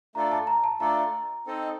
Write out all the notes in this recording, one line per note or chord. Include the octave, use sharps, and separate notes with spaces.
A3 D4 F4 A4 D5 A#5
A5
A#5
A5
A3 D4 F4 A4 D5 A#5
C4 D#4 A4 D#5